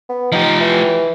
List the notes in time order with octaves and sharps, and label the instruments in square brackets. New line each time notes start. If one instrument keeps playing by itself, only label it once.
[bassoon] B3
[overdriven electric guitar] F3 G4 [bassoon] D#4
[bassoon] E3